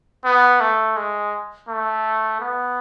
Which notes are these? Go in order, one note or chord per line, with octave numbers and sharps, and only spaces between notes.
B3
A3
G#3
A3
B3